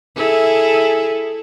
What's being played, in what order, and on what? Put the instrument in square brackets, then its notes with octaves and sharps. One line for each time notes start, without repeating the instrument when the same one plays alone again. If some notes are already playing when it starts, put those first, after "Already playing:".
[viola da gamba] E4 G#4 A4